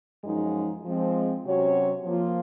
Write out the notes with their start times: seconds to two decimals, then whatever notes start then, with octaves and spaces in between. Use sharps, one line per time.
0.24 F#2 F3 G#3 D#4
0.84 F3 G#3 C4
1.45 C3 F#3 C#4 F#4 C#5
2.05 F3 A#3 F4